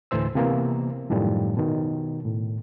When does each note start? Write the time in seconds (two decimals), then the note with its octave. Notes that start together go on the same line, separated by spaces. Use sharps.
0.11 D2 A2 E3 C5 E6
0.35 C3 E3 A#3 B3 A#4
1.10 F#2 A2 D#3 F3 G3
1.57 B2 D#3
2.25 A2